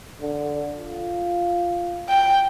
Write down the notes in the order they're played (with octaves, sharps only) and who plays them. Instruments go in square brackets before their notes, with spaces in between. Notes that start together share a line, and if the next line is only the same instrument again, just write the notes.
[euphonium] D3
F4
[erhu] G5